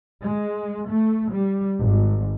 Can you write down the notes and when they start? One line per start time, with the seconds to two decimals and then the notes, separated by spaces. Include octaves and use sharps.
0.20 G#3
0.87 A3
1.31 G3
1.80 G#1